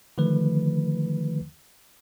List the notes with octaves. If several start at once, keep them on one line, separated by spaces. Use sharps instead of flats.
D3 D#3 F3 A3 B4